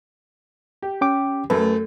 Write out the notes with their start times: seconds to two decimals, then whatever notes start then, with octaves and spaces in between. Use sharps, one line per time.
0.82 G4
1.01 C#4 G5 D6
1.50 F#2 A3 A4 B4